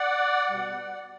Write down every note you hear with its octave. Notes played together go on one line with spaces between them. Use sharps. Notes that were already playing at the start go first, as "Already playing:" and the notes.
Already playing: D5 F#5
B2 G3